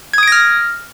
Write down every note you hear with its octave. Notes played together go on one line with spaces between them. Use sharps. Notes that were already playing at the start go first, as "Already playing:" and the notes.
D#6 F6 G#6 A#6 D7